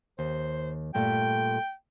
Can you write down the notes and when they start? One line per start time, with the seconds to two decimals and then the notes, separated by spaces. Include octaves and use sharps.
0.19 D#2 C5
0.95 G2 A#2 A3 G5